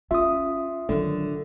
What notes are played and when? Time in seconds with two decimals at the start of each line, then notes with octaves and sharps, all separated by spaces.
0.11 C#4 F4 E5 D#6
0.89 D3 D#3 F#3